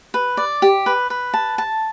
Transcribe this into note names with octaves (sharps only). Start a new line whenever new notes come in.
B4
D5
G4
B4
B4
A5
A5